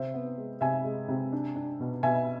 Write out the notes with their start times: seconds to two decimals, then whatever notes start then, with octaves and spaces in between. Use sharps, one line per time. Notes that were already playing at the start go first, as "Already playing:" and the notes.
Already playing: C3 C5 E5
0.14 B3
0.38 G#3
0.61 C3 E5 G#5
0.84 G#3
1.09 C3
1.32 D4
1.56 D4
1.80 B2
2.03 B2 E5 G#5